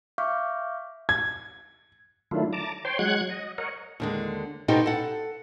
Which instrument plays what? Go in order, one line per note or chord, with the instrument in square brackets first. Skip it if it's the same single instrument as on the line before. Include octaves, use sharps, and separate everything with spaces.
[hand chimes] E5 F5 C#6 D6 F6 G6
[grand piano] G#6
[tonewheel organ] D#3 F#3 A3 D4 E4 F4
A5 A#5 D6
C5 C#5 G5 C6
F#3 G#3 F#5 F#6 G#6
D#5
A#4 C#5 D#5 F#5
[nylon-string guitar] D#2 D3 G#3
B2 C4 D#4 F#4 G4 A4
A4 F#5